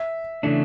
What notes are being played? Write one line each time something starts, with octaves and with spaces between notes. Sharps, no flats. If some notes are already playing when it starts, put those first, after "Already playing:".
Already playing: E5
C#3 E3 A3 D4